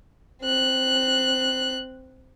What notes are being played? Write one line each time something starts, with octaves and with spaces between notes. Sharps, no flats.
C4 F#6